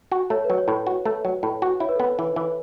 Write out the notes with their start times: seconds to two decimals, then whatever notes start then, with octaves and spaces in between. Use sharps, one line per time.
0.12 F#4
0.30 A3 C#5
0.44 B4
0.50 F#3
0.58 C#5
0.68 A2
0.87 F#4
1.05 A3
1.25 F#3
1.43 A2
1.62 F#4
1.80 E4 C#5
1.89 B4
1.96 A4
2.00 B3 B4
2.19 E3
2.36 E3